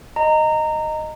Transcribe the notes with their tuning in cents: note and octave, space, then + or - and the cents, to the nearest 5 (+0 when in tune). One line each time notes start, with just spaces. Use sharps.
D#5 -5 A#5 -15